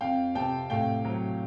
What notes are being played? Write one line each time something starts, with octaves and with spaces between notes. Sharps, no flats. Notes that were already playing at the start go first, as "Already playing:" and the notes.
F2 F5 G5
C3 G5 A5
A2 F5 G5
F#3